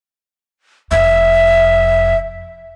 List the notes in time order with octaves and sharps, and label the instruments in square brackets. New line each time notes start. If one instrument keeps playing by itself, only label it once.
[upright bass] F1 F2 [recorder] E5